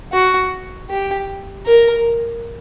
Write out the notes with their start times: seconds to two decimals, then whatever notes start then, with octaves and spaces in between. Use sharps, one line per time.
0.12 F#4
0.90 G4
1.66 A#4